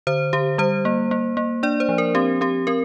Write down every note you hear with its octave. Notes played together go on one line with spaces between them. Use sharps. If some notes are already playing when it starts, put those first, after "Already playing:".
D3 C5
D3 G4
G3 C5
A#3
A#3
A#3
D4 D5
C5
F3
A#4
C4 G4
C4 G4
C4 A#4